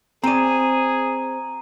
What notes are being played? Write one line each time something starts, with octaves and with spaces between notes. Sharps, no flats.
C4 G#4 D5 A#5 D#7